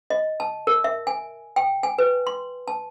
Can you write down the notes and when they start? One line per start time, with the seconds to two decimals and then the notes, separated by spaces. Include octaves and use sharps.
0.10 D#5
0.40 A5
0.67 A#4
0.84 E5
1.07 G#5
1.56 G5
1.83 G#5
1.98 B4
2.27 C6
2.68 A5